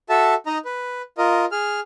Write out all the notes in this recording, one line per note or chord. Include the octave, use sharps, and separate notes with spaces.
F#4 A4 E5 A5
D#4 D#5 A#5
B4
F4 A#4 D#5
G#4 F6